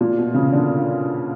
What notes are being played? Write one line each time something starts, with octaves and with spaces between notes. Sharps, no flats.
A#2
B2
C#3
D3